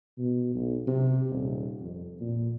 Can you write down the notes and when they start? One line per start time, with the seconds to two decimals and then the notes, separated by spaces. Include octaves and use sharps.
0.18 B2
0.55 B1
0.87 C3
1.30 D#1
1.81 F2
2.21 A#2